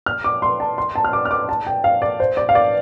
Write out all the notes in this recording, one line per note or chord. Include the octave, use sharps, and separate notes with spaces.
F6
D6
C6
A5
C6
A5
F6
D6
F6
D6
A5
G5
F5
D5
C5
D5
F5
D5